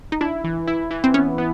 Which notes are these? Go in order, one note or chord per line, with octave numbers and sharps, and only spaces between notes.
D#4
D4 E4
E3
E4
E3
C4
B3 C#4
B3